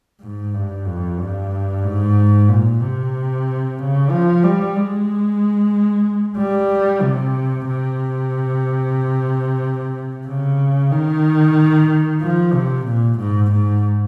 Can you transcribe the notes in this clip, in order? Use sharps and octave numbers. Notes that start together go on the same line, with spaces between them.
G#2
G2
F2
G2
G#2
A#2
C3
C#3
F3
G3
G#3
G3
C3
C3
C#3
D#3
F3
C3
A#2
G#2
G#2